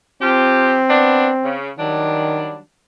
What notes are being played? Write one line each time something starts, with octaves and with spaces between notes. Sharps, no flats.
F3 C4 F4 G4
B3 D4
C#3
D#3 F#3 G3 D4